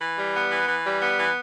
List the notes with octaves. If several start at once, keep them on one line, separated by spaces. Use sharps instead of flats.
E3
G3
B3
E3
E3
G3
B3
E3